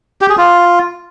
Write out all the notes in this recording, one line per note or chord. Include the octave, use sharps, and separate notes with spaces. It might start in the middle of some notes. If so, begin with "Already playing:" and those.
G4
G#4
F4